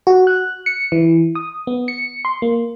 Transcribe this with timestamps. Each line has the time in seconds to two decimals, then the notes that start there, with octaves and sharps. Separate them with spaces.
0.07 F#4
0.27 F#6
0.66 C#7
0.92 E3
1.35 D#6
1.67 B3
1.88 C#7
2.25 C6
2.42 A#3